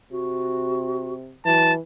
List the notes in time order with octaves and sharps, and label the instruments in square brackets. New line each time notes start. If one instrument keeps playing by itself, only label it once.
[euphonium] C3 [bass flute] F#4
[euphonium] E3 [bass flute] F#3 [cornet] A5